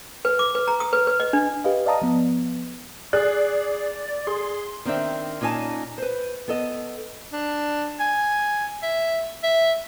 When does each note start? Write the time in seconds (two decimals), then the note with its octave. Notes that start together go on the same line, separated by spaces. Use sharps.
0.25 B4
0.39 D6
0.55 B4
0.68 A#5
0.80 D#6
0.93 B4
1.07 B4
1.20 D#5
1.33 D4
1.64 G4 B4 D#5 F5
1.86 D5 D#5 F5 A5 A#5 D#6
2.02 F3 B3
3.13 G#4 D5 F#6
4.27 G#4 C6
4.85 D#3 C4 D4 E5
5.41 A#2 C#4 D#4 C#5 G#5 A5
5.98 B4 C5
6.48 B3 A4 D#5
7.32 D4
8.00 G#5
8.83 E5
9.43 E5